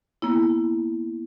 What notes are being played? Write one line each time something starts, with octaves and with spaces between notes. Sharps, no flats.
A#3 B3 E4